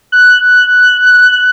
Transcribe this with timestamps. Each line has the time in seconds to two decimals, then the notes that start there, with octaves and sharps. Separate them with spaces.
0.12 F#6